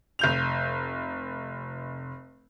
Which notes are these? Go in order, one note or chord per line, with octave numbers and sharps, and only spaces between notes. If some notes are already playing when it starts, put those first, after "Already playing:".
F1 G6 F7